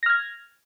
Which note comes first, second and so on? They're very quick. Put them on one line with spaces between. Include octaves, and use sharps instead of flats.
A#6 F6 G#6